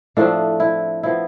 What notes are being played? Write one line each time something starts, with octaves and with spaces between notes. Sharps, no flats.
A2 F3 A3 C4 D4
E4
F3 B3 E4